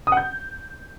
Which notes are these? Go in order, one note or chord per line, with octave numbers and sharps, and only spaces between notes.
D#6
F#5
G6